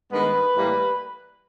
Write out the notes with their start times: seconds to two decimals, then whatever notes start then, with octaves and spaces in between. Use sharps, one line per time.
0.12 G2 D#3 G#3 B3 B4
0.55 A2 E3 G3 A#3